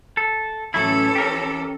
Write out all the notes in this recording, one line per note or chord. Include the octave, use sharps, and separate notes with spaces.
A4
A2 E3 F#3 C#4 E4 A4
G4 A#4